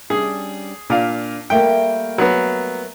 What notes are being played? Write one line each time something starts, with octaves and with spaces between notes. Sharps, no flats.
G3 C#4 D4 G#4
A#2 D4 F5
G3 A3 A#3 G5
F#3 B3